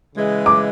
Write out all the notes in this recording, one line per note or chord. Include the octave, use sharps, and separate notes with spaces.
C#3 E3 G#3
D6